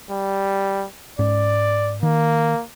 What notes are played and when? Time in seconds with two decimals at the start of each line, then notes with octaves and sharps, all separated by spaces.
0.11 G3
1.19 G#2 C#4 D5
2.03 D#3 A#3